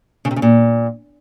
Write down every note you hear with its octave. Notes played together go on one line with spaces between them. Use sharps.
C#3
C3
C#3
A#2